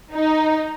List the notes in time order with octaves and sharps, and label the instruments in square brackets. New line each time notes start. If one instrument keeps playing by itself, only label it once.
[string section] D#4